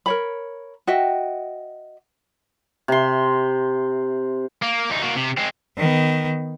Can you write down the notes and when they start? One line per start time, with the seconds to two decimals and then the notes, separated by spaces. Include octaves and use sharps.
0.06 A#4 C#5 B5
0.87 F#4 D#5 E5 G5
2.88 C3 C6
4.62 A#3
4.90 D2 D#4
5.02 A#3 F#4
5.16 C3
5.37 G#3 C4
5.77 D#3 B3